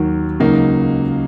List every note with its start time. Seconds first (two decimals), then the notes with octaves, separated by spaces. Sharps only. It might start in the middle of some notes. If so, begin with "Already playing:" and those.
Already playing: D#2 D#3 F#3
0.40 C#2 C#3 F#3 A#3 D#4